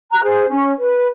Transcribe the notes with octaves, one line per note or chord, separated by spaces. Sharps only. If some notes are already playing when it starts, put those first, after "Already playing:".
A#5 F#6
G#4 C5
C#4
B4